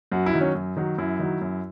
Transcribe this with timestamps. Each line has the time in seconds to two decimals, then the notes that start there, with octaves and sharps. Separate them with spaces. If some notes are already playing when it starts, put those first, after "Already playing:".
0.12 F#2 F#4
0.26 E4
0.33 D#3 F#3
0.41 C#4
0.55 F#2
0.77 D#3 F#3
0.98 F#2 E4
1.19 D#3 F#3
1.41 F#2